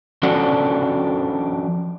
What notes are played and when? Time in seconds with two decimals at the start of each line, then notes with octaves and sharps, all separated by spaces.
0.23 F3 C#4 D4 F#4 A4 D5